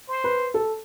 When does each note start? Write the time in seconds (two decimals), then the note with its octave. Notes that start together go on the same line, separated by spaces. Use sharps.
0.08 C5
0.24 B4
0.54 A4